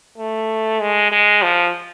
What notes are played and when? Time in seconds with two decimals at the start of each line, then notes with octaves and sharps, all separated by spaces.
0.18 A3
0.80 G#3
1.12 G#3
1.43 F3